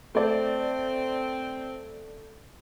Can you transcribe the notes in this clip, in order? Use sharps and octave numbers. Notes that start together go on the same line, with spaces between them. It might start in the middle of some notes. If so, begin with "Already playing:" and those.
A3 C4 D5